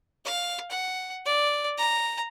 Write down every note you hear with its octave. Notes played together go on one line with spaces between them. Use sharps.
F5
F#5
D5
A#5